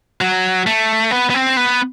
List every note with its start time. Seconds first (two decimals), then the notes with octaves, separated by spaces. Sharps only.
0.21 F#3
0.67 A3
1.11 B3
1.30 B3
1.34 C4
1.57 B3